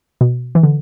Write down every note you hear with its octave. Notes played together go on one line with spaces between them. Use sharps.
B2
E3
D3